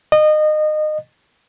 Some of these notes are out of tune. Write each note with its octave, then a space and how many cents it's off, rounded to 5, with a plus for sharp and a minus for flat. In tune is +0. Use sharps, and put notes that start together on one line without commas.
D#5 -25